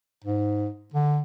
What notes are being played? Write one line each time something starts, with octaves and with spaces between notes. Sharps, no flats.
G#2
D3